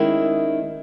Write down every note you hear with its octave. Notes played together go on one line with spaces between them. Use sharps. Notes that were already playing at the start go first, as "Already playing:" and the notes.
Already playing: D#3 G#3 C#4 E4